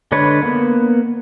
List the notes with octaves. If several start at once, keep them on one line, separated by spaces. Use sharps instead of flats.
D3 G#3 D4 B4 C#5
A#3 B3